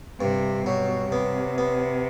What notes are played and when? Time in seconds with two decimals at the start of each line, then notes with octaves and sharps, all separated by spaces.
0.20 G2 C3
0.66 B2 F#3
1.12 C3 B3
1.58 B3